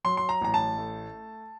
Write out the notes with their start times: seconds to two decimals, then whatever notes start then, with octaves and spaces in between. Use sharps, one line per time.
0.04 F#3 C6
0.17 C6
0.29 A#5
0.41 A1 A#5
0.54 A5
0.77 A3